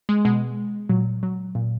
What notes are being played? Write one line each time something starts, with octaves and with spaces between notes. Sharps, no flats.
G#3
B2 G#3
A#2 F#3
F#3
A#2